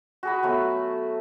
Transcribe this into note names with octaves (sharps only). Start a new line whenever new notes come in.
F#4 G#4 B5
F#3 A3 B3